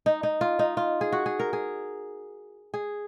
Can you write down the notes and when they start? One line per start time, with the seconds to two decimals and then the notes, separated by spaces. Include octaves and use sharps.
0.06 D#4
0.23 D#4
0.41 F4
0.59 D#4
0.77 F4
1.01 G#4
1.12 F#4
1.26 G#4
1.39 A#4
1.53 G#4
2.74 G#4